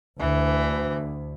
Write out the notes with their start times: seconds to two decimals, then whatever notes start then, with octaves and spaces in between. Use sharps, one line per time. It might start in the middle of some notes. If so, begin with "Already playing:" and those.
0.19 D2 E3